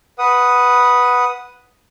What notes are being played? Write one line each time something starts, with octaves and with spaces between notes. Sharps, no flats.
B4 F#5 D#6